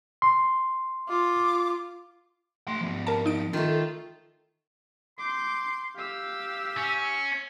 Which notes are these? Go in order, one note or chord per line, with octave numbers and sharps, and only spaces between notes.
C6
F4 D6
A3 C6
F3 B3
A#4 A5
D#4 D7
D#3 A3 F4
C6 D6 G6
G4 F5 E6
C#4